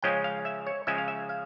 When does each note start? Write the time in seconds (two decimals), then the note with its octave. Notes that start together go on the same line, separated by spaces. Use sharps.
0.02 C#3 F3 G#3 C#4 G5
0.24 F5
0.45 E5
0.67 C#5
0.87 C#3 F3 G#3 C#4 E5
0.98 F5
1.08 E5
1.29 F5